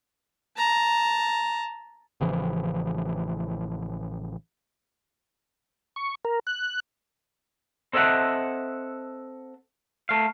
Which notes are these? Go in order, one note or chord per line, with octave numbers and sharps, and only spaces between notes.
A5 A#5
A1 C#3 E3 F3
C#6
A#4
F#6
C4 A4 D#5 E5 F#5
A3 F5